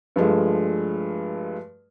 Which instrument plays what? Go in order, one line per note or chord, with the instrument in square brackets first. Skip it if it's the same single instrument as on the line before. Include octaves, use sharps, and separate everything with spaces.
[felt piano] G2 F3 G#3 A3